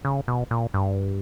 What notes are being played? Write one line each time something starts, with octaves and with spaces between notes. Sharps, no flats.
C#3
B2
A#2
G2